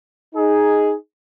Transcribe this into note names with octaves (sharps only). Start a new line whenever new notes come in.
D#4 G#4